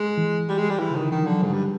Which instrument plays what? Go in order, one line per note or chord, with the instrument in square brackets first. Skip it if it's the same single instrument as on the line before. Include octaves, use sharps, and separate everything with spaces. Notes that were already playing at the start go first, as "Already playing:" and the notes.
Already playing: [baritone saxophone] G#3
[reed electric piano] E3
[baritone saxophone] G3
G#3
G3
E3
[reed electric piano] C#3
[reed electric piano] D3 [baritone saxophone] D#3
[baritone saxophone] D#3 [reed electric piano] E3
[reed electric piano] F3
[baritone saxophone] D3 [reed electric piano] F#3
[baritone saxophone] G#2 [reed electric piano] G3
[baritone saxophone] G2